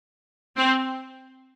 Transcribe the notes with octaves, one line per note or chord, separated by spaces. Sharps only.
C4